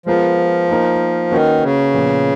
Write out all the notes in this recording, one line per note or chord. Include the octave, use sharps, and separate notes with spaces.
F3 G#3 B3 F4 A#4
A#3 D#4 A#4
D#3 A#3 C#4 F#4 B4
C#3
A#2 F3 B3